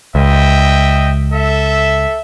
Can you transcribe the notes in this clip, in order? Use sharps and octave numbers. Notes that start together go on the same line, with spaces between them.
C#2 D#5 E5 G5
A4 E5